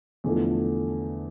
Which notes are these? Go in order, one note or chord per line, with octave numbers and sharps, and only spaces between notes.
E2 D3 F3 A3